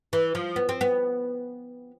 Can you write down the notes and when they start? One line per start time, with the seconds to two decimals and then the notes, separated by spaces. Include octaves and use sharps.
0.13 E3
0.35 F3
0.56 B3
0.69 C4
0.81 B3